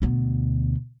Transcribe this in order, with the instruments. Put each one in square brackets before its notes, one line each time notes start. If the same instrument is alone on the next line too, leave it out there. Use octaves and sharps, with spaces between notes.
[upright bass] D2 B2